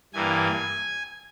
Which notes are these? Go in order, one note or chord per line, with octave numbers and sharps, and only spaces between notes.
G2 E3 A#3 G#5